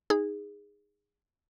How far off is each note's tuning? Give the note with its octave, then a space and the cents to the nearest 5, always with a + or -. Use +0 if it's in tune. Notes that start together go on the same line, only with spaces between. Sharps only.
D#4 +0 G#4 -15